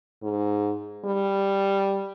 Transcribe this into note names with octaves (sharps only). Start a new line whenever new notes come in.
G#2
G3